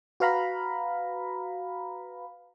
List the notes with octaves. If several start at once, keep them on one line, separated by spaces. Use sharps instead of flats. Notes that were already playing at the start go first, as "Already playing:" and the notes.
F#4 B4 F5 A#5 B5